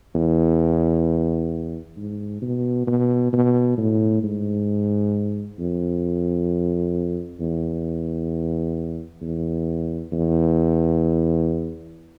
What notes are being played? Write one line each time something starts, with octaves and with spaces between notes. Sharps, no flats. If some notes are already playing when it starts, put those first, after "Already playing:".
E2
G#2
B2
B2
B2
A2
G#2
F2
E2
E2
E2